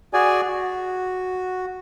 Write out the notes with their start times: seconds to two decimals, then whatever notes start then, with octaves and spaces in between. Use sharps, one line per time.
0.13 F#4 G#4 D5 G#5
0.48 F#4